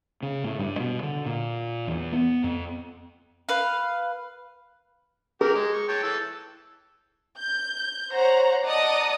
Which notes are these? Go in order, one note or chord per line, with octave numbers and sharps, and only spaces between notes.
C#3
A2
G2
B2
D3
A#2
E2
B3
F2
B4 F5
F#3 G4 G#4 A#4
G#3
C#6
C#5 G5 A5
E3 A5 E6
G6
C5 C#5 F#5 A#5
D5 D#5 F#5 A5 A#5 D#6